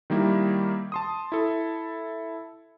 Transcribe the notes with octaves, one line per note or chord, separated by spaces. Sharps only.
D#3 G3 A#3 E4
A5 C6 D#6
E4 A4